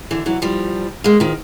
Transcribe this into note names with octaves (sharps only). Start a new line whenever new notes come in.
D3 E3
E3 F#3
F3 G3
G#3 A#3
D#3 F3